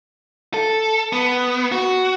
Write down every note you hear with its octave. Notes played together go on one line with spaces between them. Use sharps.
A4
B3
F#4